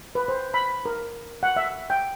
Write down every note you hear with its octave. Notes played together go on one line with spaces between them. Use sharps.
B4
C5
B5
A#4
F#5
E5
G5